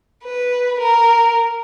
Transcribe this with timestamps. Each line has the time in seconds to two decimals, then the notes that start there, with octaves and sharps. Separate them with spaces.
0.24 B4
0.80 A#4